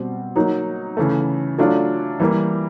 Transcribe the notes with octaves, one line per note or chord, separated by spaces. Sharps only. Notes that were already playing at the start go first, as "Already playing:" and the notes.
Already playing: B2 G3 C4
F#3 A#3 D#4
C#3 E3 A3
F#3 A3 D4 F4
E3 G3 A#3